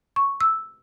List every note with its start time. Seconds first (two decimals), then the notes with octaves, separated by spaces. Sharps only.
0.16 C#6
0.41 E6